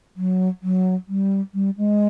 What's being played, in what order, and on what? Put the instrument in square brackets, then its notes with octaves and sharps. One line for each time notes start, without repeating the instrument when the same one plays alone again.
[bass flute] F#3
F#3
G3
G3
G#3